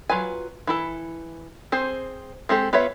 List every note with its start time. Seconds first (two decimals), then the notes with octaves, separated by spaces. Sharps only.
0.09 F#3 F4 B4 G#5
0.67 E3 E4 A4
1.72 C4 G#4 C5
2.49 G#3 C4 G4 A4
2.73 B3 F4 B4 C#5 E5